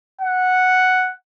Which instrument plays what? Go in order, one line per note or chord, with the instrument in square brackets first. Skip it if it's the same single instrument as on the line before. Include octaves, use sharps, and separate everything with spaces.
[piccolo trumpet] F#5